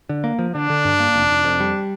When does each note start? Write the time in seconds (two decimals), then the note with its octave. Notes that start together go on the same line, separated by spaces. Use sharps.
0.09 D3
0.24 A#3
0.39 F3
0.54 D3 D4
0.70 D3
0.85 G2
1.00 A#3
1.15 F1
1.30 F1
1.45 F2
1.60 G3